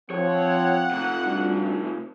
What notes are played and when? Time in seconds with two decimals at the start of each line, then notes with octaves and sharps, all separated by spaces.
0.10 F3 C4 C#5 F#5
0.91 C3 A3
1.25 G3 D4 F#4